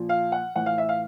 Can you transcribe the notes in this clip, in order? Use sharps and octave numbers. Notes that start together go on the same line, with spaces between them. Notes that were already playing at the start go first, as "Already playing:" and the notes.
Already playing: A#2 F3
F5
F#5
A2 E3 F#5
F5
E5
F5